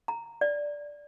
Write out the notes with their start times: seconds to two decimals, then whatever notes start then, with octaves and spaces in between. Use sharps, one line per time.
0.08 A#5
0.41 D5